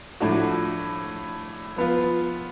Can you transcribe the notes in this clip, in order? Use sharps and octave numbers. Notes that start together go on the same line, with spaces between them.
A2 F3 A3 D4 F#4
F3 B3 F4